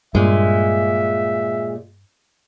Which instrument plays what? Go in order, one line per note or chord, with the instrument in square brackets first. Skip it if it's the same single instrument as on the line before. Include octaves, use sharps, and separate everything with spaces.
[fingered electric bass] G2 [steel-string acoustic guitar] A#2 G#3 [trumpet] E5